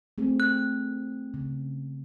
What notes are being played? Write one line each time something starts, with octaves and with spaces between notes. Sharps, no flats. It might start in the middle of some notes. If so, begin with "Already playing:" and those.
A3 C4 G#4
F#6
C#3